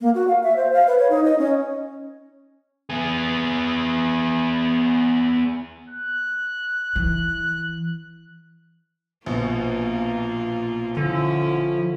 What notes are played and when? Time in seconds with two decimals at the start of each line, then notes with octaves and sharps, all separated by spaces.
0.01 A#3
0.15 F#4
0.28 F5
0.43 E5
0.56 C5
0.73 F5
0.87 B4
0.99 C#5
1.10 D#4
1.24 D#5
1.38 C#4
2.90 B3 G#4
5.90 F#6
6.96 E3
9.26 A#1 B2 A#3 F4
10.97 D3 F3 C#4 E4